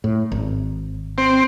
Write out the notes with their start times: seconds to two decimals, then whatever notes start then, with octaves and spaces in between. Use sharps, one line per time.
0.04 A2
0.32 G#1
1.18 C4